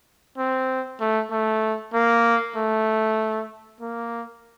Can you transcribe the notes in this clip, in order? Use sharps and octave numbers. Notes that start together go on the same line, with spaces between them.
C4
A3
A3
A#3
A3
A#3